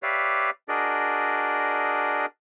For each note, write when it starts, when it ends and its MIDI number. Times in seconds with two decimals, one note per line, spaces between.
0.03 0.50 67
0.03 0.50 71
0.03 0.50 73
0.03 0.50 74
0.03 0.50 76
0.03 0.50 77
0.69 2.26 62
0.69 2.26 66
0.69 2.26 68
0.69 2.26 70
0.69 2.26 74
0.69 2.26 75